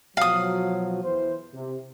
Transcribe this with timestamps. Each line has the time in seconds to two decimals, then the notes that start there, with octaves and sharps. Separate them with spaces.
0.17 B2 F3 F#3 F5 D#6
1.04 E2 E3 C5
1.54 C3